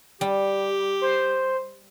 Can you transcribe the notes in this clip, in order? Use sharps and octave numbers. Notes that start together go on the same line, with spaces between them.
G3 G4
C5